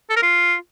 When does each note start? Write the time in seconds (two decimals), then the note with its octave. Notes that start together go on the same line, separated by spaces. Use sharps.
0.10 A4
0.16 A#4
0.22 F4